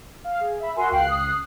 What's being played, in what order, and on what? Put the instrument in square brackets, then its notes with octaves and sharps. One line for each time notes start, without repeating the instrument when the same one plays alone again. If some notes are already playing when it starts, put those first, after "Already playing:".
[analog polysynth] F5
G#4
E5 B5
[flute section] F#4 G#5 C6 [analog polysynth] A#4 E5
[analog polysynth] C#2 F#6 C7 [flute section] F5 G5
[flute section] D#6